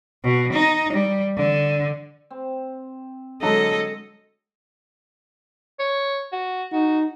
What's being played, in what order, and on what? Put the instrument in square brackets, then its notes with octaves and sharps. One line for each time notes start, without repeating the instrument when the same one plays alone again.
[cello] B2
D#4
G3
D3
[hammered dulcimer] C4
[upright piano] D3 F#3 A5 [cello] G#3 A4 [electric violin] D#5
[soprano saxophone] C#5
F#4
[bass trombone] D#4 [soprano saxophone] F#4